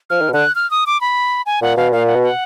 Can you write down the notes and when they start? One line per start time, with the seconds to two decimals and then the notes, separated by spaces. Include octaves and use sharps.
0.10 F3 F6
0.21 D#3
0.29 B2
0.33 D3 F#6
0.55 F6
0.71 D#6
0.87 D6
1.01 B5
1.46 G#5
1.62 A#2 F#5
1.77 B2 F5
1.92 A#2 F5
2.07 F#5
2.15 B2
2.23 F#5